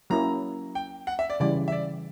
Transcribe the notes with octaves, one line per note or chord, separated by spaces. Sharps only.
F#3 A#3 C#4 E4 A#5
G5
F#5
E5
D5
C#3 E3 G3 D5
E5
D5